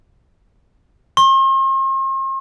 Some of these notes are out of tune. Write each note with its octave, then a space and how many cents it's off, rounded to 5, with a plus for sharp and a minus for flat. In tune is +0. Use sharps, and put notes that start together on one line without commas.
C6 +45